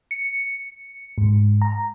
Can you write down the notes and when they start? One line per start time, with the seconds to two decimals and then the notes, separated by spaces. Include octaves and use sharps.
0.11 C#7
1.18 G#2
1.62 A#5